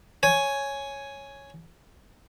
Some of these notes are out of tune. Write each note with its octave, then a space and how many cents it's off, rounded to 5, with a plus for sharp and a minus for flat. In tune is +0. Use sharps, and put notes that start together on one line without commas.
C#5 +0 G#5 +5